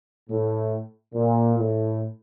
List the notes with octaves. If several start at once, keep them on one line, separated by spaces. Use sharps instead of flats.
A2
A#2
A2